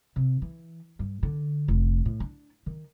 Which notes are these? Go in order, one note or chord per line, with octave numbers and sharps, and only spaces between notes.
C3
E3
G2
D3
F1
A2
D4
D#3